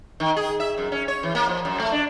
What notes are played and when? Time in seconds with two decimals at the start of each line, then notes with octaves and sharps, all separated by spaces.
0.20 D#3
0.36 G#4
0.60 E5
0.78 F#2
0.92 C#4
1.08 C#5
1.23 E3
1.35 A#3
1.49 F3
1.65 F#2
1.80 A3
1.92 D4